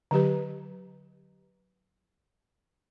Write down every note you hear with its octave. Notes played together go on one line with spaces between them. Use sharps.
D3 F#3 G4 B4